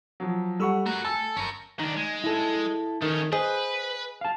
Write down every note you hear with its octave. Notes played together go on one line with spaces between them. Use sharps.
F3 F#3
G3 A4 F#5 B5 C#6 E6
A3 F#4 A#4
A4 G#5 E6
G1 C#4 A#4
D#3 D4 D#4
G#3
E4 A4
D#3 A3 C#4
G#4 B4 C5 D#5
F5 A5